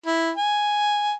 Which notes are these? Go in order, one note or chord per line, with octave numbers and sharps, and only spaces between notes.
E4
G#5